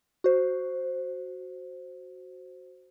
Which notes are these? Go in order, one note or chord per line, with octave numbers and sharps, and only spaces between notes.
F#4 C5